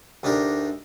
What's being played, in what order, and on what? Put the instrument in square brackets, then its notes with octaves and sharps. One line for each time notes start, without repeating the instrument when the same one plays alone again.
[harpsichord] D2 D4 D#4 G4 A#4